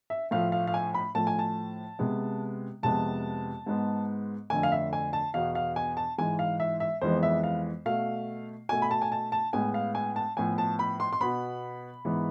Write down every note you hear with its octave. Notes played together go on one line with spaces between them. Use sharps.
E5
A2 F3 A3 F5
F5
F5
G#5
B5
A2 F3 A3 A5
G#5
A5
C3 G#3 B3
F2 C3 G#3 B3 A5
G#2 G#3 B3
F2 D3 A3 G#5
F5
E5
G#5
A5
E2 B2 B3 F5
F5
G#5
A5
G#2 E3 G#3 G#5
F5
E5
E5
F2 E3 G#3 B3 C5
E5
F5
B2 A3 F5
B2 A3 G#5
B5
A5
G#5
A5
A5
A2 G#3 B3 G#5
F5
G#5
A5
A2 F3 B3 G#5
A5
B5
C6
C6
B2 B3 B5
G#2 E3 B3